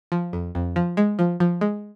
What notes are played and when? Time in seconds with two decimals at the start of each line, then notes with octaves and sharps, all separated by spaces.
0.12 F3
0.33 F2
0.55 F2
0.76 F3
0.97 G#3
1.19 F3
1.40 F3
1.61 G#3